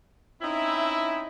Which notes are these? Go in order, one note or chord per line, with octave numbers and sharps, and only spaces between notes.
C4 C#4 D#4 E4